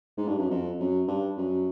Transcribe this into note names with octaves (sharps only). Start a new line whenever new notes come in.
G#2
G2
F#2
F2
F#2
G2
F#2